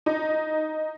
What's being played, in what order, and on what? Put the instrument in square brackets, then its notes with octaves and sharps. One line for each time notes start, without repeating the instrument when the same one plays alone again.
[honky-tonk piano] D#4